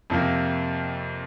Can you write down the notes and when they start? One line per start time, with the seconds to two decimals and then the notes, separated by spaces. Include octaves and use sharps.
0.10 F2 C3 F3 A#3